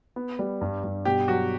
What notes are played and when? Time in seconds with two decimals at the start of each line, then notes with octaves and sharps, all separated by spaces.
0.16 B3
0.39 G3
0.61 G2
0.84 G2
1.05 B2 G4
1.28 F#3 F#4